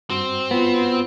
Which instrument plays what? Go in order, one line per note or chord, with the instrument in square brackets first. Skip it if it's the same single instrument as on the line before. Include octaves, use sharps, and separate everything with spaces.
[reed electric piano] G2 F#4 [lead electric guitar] C4
[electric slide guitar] B3 [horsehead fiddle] F4